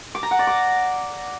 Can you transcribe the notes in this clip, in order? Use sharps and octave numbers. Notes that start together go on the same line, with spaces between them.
D6
A#5
F#5
D5
D6